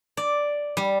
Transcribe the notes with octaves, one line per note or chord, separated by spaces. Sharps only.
D5
G3